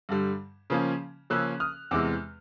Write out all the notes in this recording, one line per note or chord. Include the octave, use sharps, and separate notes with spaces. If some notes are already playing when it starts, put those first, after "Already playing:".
G2 D3 G3
C#3 F3 A#3 C#4
C#3 F3 A#3 C#4 E6 F#6
D#6 F6
E2 C3 E3 G#3 D6 E6